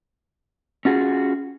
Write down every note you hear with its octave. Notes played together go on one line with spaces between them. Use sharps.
C#4 F4 F#4 G#4